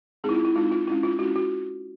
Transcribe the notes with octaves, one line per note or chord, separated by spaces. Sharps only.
G#3 C4 D#4 G#4
E4
F4
E4
G#3 C4 D#4 F4
F4
G#3 C#4 E4
F4
G#3 C#4 E4 F#4
F#4